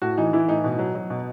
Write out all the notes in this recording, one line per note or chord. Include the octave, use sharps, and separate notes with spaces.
A2 F#4
E3 D#4
E3 E4
A2 D#4
B2
F#3
F#3
B2